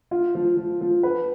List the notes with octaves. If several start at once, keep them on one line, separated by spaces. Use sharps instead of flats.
F4
F3
F3
F3
B4